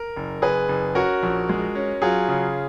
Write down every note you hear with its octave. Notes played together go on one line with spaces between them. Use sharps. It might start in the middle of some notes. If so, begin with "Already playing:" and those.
Already playing: A#4
F#1
F#1 G#4 B4
F#1
C#4 F#4 A#4
A#1
G#3
C#4
F#3 F4 G#4
C#3